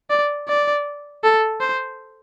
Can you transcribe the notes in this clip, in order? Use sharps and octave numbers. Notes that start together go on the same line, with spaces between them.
D5
D5
A4
C5